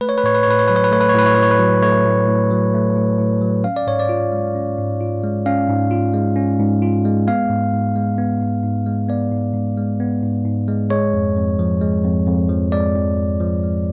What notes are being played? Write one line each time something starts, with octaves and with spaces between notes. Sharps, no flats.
A3 B4
C#5
B4
A2 C#5
B4
C#5
A2 B4
C#5
F#3 B4
C#5
B4
A3 C#5
B4
C#5
A2 B4
C#5
A2 B4
C#5
B4
F#3
A3 C#5
A2
A2
F#3
A3
A2
A2
F#3
C#4 F5
D5
G#2 C#5
D5
F4
G#3
C#4
G#2
F4
G#3
C#4 F5
G#2
F4
G#3
C#4
G#2
F4
G#3
B3 F5
G#2
G#2
G#3
B3
G#2
G#2
G#3
B3 D5
G#2
G#2
G#3
B3
G#2
G#2
G#3
G#3 C#5
F2
F2
F3
G#3
F2
F2
F3
G#3 D5
F2
F2
F3
G#3